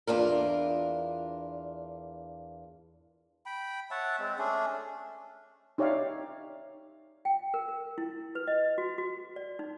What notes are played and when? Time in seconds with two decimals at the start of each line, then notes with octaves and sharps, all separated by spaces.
0.07 E2 D4 F4 A#4
3.46 G5 B5
3.91 C#5 E5 F#5 A5
4.19 G#3 C4
4.39 A3 C#4 D4 G#4
5.78 D#4 G4 C#5 D5 E5 F5
7.25 G5
7.54 A#4
7.68 A#4
7.98 E4
8.35 B4
8.47 D#5
8.78 F#4
8.98 F#4
9.36 D5
9.59 D#4